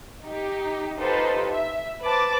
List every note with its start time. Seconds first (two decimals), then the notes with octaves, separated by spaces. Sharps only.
0.23 D#4 G4
0.98 D#4 F4 G4 A4 B4 C5
1.49 E5
2.03 B4 C5 A5 D6 A6